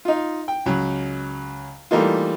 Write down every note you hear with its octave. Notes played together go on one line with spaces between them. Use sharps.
D#4 F4
G5
C#2 F#3
E3 G3 A3 A#3 D#4 F4